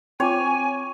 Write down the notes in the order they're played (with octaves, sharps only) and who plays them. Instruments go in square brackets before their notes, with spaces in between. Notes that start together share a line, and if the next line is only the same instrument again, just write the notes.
[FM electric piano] C4 F4 [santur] C#5 [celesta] G5 D6 [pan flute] G#5